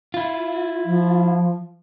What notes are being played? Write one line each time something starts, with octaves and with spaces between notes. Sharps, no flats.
E4 F4
F3